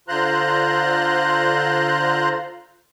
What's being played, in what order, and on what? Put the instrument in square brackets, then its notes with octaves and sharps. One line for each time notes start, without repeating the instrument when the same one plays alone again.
[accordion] D3 F4 C5 A#5 C6 F#6